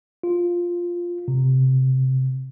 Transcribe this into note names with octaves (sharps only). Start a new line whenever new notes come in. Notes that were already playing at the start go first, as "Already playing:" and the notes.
F4
C3